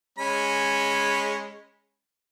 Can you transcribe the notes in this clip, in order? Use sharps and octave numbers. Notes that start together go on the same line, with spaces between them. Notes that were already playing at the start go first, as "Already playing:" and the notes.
G#3 C#4 B5